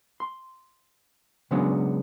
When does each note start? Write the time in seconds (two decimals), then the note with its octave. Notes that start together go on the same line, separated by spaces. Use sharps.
0.20 C6
1.51 C#3 F#3 G#3 B3 C#4 D4